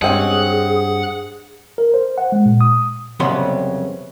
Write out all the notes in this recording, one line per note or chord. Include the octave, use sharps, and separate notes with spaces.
G2 G#3 C4 C#4 G#4 F#5
A#4
C5
F#5
G#3
A#2
D#6
C2 F2 C#3 F#3 B3 C6